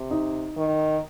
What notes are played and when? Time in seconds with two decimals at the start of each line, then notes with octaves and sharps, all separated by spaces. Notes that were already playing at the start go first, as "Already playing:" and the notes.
Already playing: C3
0.11 D#4
0.57 D#3